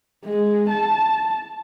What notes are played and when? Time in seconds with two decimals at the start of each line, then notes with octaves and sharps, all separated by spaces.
0.25 G#3
0.69 A5